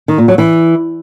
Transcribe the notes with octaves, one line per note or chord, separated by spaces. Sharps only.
D#3
A#2
F#3
E3